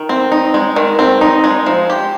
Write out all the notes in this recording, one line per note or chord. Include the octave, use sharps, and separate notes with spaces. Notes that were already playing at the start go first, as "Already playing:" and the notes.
Already playing: D#3
C4
D#4
G#3
D#3
C4
D#4
G#3
F3
G4